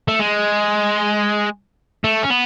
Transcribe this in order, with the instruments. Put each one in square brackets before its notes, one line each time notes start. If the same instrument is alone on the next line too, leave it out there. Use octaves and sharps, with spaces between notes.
[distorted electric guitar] A3
G#3
A3
C#4
B3